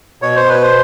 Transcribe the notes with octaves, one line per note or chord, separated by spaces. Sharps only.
B2 C#5
C5
B2 B4
C5